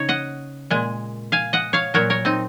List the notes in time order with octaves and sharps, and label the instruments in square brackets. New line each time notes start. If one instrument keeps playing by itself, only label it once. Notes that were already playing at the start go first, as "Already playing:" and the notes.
Already playing: [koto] C#3 D#4 C#5
D#5 F#5
A#2 G#3
F5 G#5
D#5 F#5
C#5 F5
A#2 F#3 A#4 C#5
A#4 C#5
C4 D#4